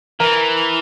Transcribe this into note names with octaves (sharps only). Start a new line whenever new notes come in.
E3 A#4